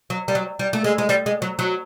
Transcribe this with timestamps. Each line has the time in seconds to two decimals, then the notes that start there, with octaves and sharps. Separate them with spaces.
0.10 F#3
0.28 G3
0.35 F#3
0.59 G3
0.73 A3
0.84 G#3
0.98 G#3
1.09 G3
1.26 G#3
1.42 F#3
1.59 F#3